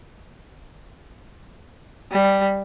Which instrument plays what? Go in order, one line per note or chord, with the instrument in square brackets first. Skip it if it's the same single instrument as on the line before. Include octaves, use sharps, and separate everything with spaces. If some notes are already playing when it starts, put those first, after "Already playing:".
[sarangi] G3